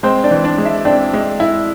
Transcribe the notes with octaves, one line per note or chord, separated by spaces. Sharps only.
G#3 C4 C5
D4 D5
E3
D4 D5
G#3
E4 E5
C4 D4 D5
G#3
E4